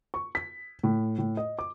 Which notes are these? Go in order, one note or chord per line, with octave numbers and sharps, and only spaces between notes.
C#6
B6
A2
A2
D#5
D6